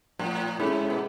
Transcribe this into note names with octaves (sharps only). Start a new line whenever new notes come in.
A2 F3
G#2 G#3 C#4 E4 A4
B2